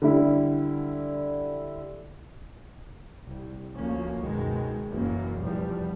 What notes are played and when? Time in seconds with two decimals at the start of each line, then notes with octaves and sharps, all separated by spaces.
0.02 D3 G3 E4
3.26 C2
3.76 D2 F3 A#3 C#4
4.21 C#2 F#2 B2 D#3 G#3
4.88 F#1 F#2 E3 A#3 C#4
5.39 F1 E2 B2 F3 G3